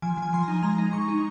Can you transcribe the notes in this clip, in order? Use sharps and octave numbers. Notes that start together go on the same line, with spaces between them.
F3 G#5
F3
G#5
F3 C6
A#5
D#4
G#3 A#5
D#4
G#3 C#6
D#4